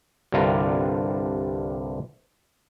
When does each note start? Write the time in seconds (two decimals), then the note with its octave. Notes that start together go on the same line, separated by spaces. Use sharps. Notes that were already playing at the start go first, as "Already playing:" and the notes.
0.32 C2 G2 D3 G3 F4 A#5